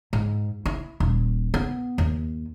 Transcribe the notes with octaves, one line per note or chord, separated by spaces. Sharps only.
G#2
E4
D#1
B3
D#2